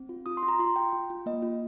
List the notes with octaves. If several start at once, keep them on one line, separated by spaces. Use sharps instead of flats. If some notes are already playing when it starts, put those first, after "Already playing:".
Already playing: C4
F4
F4 D#6
C6
F4
A#5
F4 C6
F4 G5
F4
F4
A#3 D#5
F4